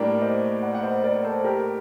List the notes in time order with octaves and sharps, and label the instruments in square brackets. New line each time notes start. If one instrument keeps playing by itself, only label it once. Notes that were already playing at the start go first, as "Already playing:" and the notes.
Already playing: [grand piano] A2 G3 A#3 D4 [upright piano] A#4 D5
[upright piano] C5 D#5
D5 F#5
F#5
C5 D#5
A#4 D5
A4 C5
G4 A#4